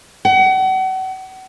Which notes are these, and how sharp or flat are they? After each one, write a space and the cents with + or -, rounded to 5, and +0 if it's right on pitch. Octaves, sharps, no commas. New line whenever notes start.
F#5 +35